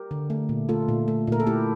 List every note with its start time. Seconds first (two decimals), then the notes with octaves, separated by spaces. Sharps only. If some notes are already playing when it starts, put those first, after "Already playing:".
Already playing: G4 A#4
0.11 D3
0.30 A3
0.49 A#2
0.69 A3 F4 A4
0.89 A#2
1.08 A3
1.27 A#2 A#4
1.40 A4
1.47 A3 E4 G4